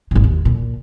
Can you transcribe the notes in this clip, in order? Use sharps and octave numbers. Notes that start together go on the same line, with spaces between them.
G#1 A#2
D#2
A#2